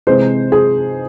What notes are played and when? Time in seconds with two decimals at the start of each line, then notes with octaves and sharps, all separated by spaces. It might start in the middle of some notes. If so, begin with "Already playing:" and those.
0.07 C3 E3 G#3 C5
0.52 G#4